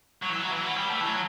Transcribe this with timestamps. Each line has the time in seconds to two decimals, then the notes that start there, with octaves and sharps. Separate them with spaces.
0.22 F#3
0.29 E3
0.40 F#3
0.52 E3
0.64 F#3
0.75 G3
0.90 A3
1.00 E3
1.06 F#3